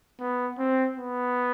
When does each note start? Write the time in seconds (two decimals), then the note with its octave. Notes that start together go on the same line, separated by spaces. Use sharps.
0.20 B3
0.58 C4
0.97 B3